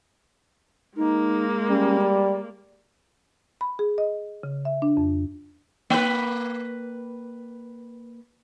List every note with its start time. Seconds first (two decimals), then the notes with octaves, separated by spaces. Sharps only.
0.97 G#3 A#3 D#4
1.69 G3 C#4
2.01 D5
3.61 B5
3.79 G#4
3.98 D#5
4.43 C#3
4.65 E5
4.82 D4
4.97 F2
5.90 A#3 B4